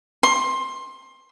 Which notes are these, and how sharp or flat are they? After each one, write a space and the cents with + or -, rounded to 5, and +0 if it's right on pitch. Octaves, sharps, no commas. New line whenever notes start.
C6 +20